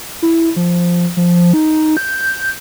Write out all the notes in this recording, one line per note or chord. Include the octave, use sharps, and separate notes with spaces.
E4
F3
F3
D#4
G6